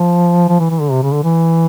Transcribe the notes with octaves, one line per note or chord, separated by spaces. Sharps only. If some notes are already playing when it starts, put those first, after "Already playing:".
Already playing: F3
F3
E3
E3
D3
C3
C#3
D3
E3